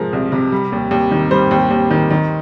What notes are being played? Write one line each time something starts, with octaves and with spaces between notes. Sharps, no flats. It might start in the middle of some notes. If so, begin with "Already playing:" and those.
Already playing: C3 F3 G#3 A#4
C2
C3
G3
D#2
D#2
D#3
G3 C5
D#2
D#2
D#3
D#3